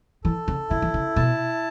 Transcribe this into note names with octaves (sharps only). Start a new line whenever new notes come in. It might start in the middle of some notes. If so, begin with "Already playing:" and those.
E3 A4
C#3
C#3 E4
E3
C#3
B2 A5